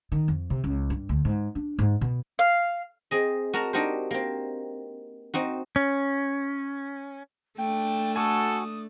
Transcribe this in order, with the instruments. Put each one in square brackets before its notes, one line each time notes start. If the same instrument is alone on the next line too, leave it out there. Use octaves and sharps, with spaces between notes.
[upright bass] D#3
F2
C3
C#2
G2
D2
G#2
D4
G#2
B2
[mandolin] F5
[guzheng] C4 G#4 D#5
F#4 A#4 A5 A#5
D4 D#4 F#4 G4 A#4 C5
A#3 C4
C4 D#4 F#4
[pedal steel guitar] C#4
[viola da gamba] A3 D4 [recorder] G5
[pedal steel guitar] F#4 G#5 [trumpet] A4 [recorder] D#6